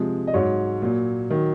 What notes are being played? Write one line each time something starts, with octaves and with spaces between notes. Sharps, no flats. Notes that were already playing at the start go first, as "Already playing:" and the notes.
Already playing: C3 F3 G#3
D#5
G#2 F#3 C#5
A#2 F#3
D#3 F#3